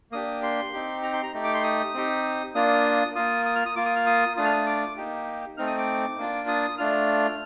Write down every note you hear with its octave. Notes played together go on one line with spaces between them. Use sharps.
A#3 D4 G4 D#6
C6
C4 D#4 G4
A#5
C6
A#5
A3 D#4 G4
D6
C6
D#6
C4 D#4 G4
A#3 D4 F4 D#6
A#3 F4 D#6
D#6
F6
D#6
A#3 F4 D6
D#6
F6
D#6
A3 D4 F4 D#6
F6
D#6
D6
A#3 D#4 G4
A3 C4 D#4 F6
D#6
D6
A#3 D4 F4
D#6
A3 D4 F4 F6